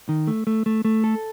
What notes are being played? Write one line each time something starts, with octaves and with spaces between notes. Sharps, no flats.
D#3
A3
A3
A3
A3
A4